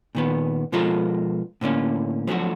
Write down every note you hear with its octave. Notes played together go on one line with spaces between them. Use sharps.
A#2 D#3 B3
B2 F3 G#3 F4 A4 A#4
A2 D3 A#3 C#4
F3 F#3 A3 D4 F#4